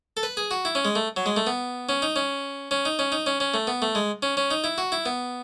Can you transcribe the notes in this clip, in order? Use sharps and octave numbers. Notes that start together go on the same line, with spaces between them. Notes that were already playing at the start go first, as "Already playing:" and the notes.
A4
B4
G#4
F#4
E4
C#4
G#3
A3
F#3
G#3
A3
B3
C#4
D#4
C#4
C#4
D#4
C#4
D#4
C#4
C#4
A3
B3
A3
G#3
C#4
C#4
D#4
E4
F#4
E4
B3